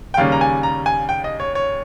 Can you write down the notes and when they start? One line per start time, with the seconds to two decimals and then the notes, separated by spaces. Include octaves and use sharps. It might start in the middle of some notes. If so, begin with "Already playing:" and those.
0.14 G5
0.17 D#2 C#3 G3 A#3 C#4 F5
0.32 A#5
0.41 G#5
0.63 A#5
0.86 G#5
1.09 G5
1.24 D#5
1.40 C#5
1.55 C#5